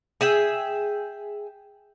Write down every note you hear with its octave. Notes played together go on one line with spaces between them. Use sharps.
G#4 E5 G5